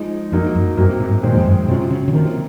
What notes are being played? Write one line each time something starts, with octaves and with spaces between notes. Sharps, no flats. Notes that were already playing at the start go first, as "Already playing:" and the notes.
Already playing: F3 G#3 D#4
F2 F#3 A#3 D#4 F#4
F#2
F#2 C3 F#3 A#3
G#2
A#2 D#3 G#3 C4
F2
F#2
C3 F#3 C#4 F4
C#3
C#3
C3 D#3 F3 A#3 F4